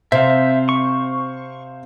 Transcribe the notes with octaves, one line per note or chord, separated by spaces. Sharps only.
C3 C5 E5 F5
C#6